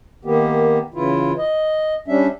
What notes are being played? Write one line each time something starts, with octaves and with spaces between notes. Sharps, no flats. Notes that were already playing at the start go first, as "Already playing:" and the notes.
D#3 A#3 B3 G4
C#3 E3 E4 F4
D#5
G3 C#4 D4 E5